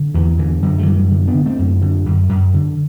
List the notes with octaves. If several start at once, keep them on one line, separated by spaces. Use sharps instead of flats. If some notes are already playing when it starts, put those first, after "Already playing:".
Already playing: D3
E2 E3
D3 E3
F#2 D3 F#3
A3
F#2 E3 G3
D3
B3 D4
D3
A3 C4
F#2
D3
F#2
F#2
D3